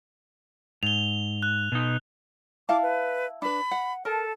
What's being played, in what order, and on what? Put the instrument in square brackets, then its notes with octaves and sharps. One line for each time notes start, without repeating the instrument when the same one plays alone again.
[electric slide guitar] G#2 [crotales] F7 G7
[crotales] F#6
[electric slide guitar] B2 D#4
[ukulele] E4 F5 A5 [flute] D6
[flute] B4
[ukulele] D4 B4 [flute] B5
[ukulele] F#5
[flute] A4 [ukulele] A#4 A5